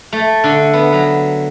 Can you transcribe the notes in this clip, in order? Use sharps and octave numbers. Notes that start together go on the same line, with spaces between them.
A3
D3
B3
F#3